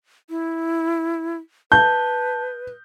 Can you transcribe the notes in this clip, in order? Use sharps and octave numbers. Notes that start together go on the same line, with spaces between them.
E4
B4 A5 G6